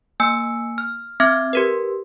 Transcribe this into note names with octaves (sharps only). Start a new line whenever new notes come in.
A#3 G#5 E6 C#7
F6
C4 E5 D6 F6 G#6
G4 A#4 B4